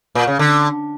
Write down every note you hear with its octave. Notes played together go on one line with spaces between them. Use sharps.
A#2
C#3
D3